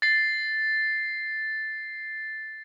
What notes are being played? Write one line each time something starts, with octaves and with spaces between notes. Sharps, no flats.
A6 C7